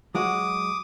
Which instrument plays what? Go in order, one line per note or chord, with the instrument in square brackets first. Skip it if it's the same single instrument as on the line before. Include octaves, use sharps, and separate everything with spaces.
[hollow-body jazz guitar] F#3 G#3 F#4 [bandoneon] D6 D#6